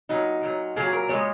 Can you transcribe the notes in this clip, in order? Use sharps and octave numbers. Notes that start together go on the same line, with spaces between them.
A#2 F#3 D#4
A#2 F#3
A#2 F#3 G#4
A#4
A#2 G#3 C#5